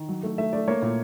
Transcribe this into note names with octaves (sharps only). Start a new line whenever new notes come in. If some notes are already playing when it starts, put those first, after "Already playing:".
Already playing: D#3
F#3
A3
A3 E5
A3 D5
A#3 C#5
A#2